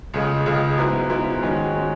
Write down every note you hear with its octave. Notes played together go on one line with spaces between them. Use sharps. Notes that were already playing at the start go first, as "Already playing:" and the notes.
C#2 C#3 G#3
C#2 C#3 G#3
G#2 F#3 B3 E4
G#2 F#3 B3 E4
G#2 D#3 G#3 C#4 F#4
D#3 G#3 C#4 F#4